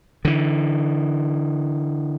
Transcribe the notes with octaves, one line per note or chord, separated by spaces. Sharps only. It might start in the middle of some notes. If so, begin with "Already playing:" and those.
D3 E3